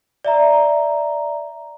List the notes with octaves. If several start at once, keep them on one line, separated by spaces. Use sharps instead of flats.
D5 E5 A#5